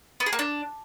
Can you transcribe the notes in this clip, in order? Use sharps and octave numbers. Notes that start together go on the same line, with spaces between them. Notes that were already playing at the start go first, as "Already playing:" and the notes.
B3
G#4
A#3
D4